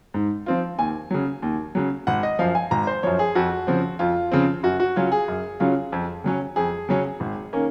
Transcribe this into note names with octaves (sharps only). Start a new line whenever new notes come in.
G#2
F3 C4 F4
D#2 G#5
C#3 F#3
D#2
C#3 F#3
G#1 F#5
D#5
F#2 F3 F5
G#5
G#1 A#5
C5
F#2 F3 C#5
G#4
F2 F#4
C#3 F3 C4
F2 F4
C#3 F3 C4
F#2 F#4
F#4
C#3 F#3 C#4 F4
G#4
F#2
C#3 F#3 C#4 F4
F2
C#3 F#3 C#4
F2 G#4
C#3 F#3 C#4
G#1
D#3 A#3 C#4